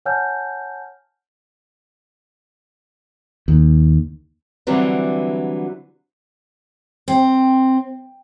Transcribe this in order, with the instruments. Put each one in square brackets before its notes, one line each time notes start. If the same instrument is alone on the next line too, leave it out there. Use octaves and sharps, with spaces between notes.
[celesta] C#5 F#5 G#5 A5 F6 G6
[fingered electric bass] D#2
[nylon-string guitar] D3 E3 F#3 G3 C4
[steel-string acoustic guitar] C4